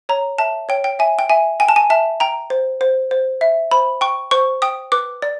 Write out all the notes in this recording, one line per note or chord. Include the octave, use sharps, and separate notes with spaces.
C#5 A#5
E5 A5
C#5 G5
G5
E5 G#5
G5
E5 G#5
G5 G#5
A5
G#5
E5 A5
G5 A#5
C5
C5
C5
E5
C5 B5
G5 C#6
C5 C#6
G5 D#6
B4 D6
D5